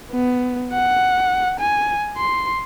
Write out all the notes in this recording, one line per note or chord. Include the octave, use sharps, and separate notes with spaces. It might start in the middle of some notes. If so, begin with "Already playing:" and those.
B3
F#5
G#5
C6